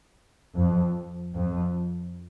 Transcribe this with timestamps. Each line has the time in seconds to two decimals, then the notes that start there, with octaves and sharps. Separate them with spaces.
0.56 F2
1.32 F2